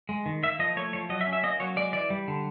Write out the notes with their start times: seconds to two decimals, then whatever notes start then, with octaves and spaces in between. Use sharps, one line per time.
0.09 G#3
0.26 D#3
0.43 A#3 E5
0.59 F3 D#5
0.76 A3 C#5
0.93 F3 C#5
1.09 F#3 D#5
1.21 E5
1.27 C#4
1.33 E5
1.43 A#3 D#5
1.60 F#3 C#5
1.76 G#3 D5
1.93 E3 D5
2.10 G3
2.28 D3